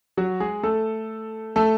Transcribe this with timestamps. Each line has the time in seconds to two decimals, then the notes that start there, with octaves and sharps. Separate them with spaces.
0.17 F#3 F#4
0.40 G#3 G#4
0.63 A3 A4
1.56 A3 A4